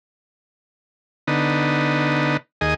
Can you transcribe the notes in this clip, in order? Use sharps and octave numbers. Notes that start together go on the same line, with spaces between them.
D3 B3 D#4
D#2 G#4 D#5